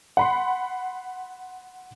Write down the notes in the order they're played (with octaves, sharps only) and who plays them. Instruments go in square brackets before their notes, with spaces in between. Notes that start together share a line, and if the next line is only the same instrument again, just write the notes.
[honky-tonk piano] F#5 B5 C6